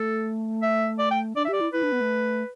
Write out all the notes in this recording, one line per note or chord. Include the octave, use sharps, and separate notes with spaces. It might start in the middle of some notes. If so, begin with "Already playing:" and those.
Already playing: A3 A4
E5
D5
G5
D4 D5
E5
G4 D5
E4
E4 B4
D4
B3
A3